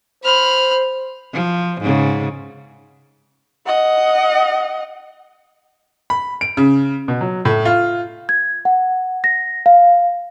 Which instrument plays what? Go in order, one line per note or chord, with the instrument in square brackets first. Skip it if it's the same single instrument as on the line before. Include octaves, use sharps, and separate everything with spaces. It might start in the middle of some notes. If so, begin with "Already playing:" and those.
[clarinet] C5 [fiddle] B5 F6
[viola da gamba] F3
G#2 C#3
[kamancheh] D#5 F#5
[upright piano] B5
D7
C#3
B2
F#3
A2
F4
[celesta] G#6
F#5
A#6
F5